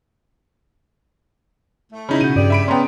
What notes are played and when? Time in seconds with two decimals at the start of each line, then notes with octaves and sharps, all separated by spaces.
1.92 A3
2.09 C#3 C#4 D#4 E4 B5
2.21 B2 F#4 G6 D#7
2.36 G2 G4 G#4 D5
2.50 E5 B5 D7
2.68 B3 C#4 G5 A#5 C6